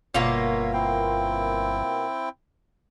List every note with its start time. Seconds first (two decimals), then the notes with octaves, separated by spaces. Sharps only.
0.14 G1 B2 A#3 F4 C#5 E5
0.73 C4 E4 G5